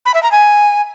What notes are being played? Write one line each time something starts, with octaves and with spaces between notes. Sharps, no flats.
B5
E5
A#5
G#5